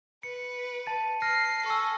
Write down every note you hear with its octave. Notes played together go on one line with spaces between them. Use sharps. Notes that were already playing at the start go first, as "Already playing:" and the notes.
B4 C#7
A5 A6 D#7
F6 A#6 C7
A4 G#5 C#6 E6